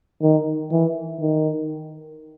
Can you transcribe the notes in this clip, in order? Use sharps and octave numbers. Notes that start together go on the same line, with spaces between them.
D#3
E3
D#3